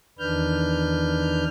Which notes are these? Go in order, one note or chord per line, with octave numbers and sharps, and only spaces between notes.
E2 D#3 D4 B4 F6 G6